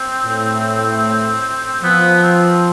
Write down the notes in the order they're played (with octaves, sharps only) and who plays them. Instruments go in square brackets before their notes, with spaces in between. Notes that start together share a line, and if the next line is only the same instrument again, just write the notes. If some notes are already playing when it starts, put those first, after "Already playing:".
Already playing: [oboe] C4
[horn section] A2
[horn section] F3 [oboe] B3
[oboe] C4